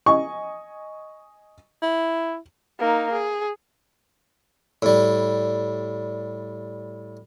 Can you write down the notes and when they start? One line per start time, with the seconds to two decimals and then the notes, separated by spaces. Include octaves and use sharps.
0.06 D#5 G#5 C#6
1.82 E4
2.79 A#3 D#4
3.12 G#4
4.82 A2 G3